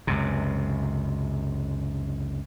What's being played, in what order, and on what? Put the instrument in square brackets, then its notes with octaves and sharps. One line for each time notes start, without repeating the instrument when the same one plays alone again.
[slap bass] C#2 F#2 C3